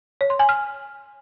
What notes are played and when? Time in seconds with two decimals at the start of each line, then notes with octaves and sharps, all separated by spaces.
0.21 C#5
0.30 C6
0.39 G#5
0.49 F6